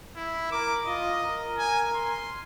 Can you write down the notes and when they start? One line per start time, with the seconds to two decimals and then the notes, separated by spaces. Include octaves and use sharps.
0.16 E4
0.52 A#4 D6
0.86 F4 D#5
1.23 A#4
1.58 G#5
1.94 C6